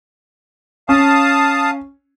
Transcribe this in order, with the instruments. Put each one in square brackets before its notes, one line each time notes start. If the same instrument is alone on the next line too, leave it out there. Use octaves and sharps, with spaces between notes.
[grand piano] C#4 [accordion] F5 A5 D#6